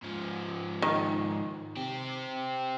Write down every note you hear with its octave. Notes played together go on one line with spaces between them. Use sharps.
G#2 F3
D#3
C4 G4